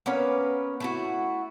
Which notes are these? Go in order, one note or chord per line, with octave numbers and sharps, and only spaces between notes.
A#3 B3 C#4 B4
A3 E4 F#4